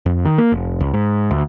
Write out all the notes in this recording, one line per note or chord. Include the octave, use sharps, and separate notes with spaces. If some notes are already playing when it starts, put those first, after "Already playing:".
F2
D#3
A#3
F1
C#2
G#2
D2